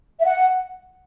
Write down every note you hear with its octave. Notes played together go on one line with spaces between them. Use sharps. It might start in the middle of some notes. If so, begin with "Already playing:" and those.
E5
F#5